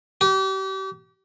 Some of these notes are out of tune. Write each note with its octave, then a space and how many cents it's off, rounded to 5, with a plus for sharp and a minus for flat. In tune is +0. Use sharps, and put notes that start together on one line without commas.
G4 -35